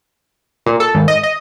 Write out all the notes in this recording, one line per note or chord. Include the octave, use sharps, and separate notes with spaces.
A#2
A4
G#1
D#5
D#5